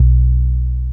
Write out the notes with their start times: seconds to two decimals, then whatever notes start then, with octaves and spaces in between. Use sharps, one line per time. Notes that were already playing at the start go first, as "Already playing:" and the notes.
Already playing: B1